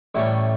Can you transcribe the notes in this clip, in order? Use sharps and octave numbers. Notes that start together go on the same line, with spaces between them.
A1 A2 G3 C#4 E4